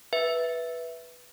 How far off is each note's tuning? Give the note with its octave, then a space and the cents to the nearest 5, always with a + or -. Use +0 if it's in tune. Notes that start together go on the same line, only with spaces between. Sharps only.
B4 -5 E5 +0